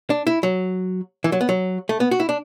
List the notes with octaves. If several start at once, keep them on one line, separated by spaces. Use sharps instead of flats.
D4
E4
F#3
E3
F#3
B3
F#3
A3
B3
F#4
E4
D4